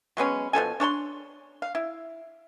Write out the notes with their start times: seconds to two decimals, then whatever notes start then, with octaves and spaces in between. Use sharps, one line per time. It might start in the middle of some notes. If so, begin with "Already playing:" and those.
0.17 F#3 G#3 B3 C#4
0.53 B2 F3 A4 G#5
0.80 D4 C#5 A5 C6
1.62 F5
1.75 E4